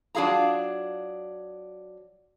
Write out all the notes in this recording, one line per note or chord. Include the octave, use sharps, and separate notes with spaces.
F#3 D4 F4 G#4 F5 A#5